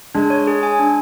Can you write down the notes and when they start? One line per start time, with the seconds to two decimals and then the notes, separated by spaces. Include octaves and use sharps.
0.15 G#3 D4
0.30 C#5
0.47 G#4
0.63 G#5
0.79 D4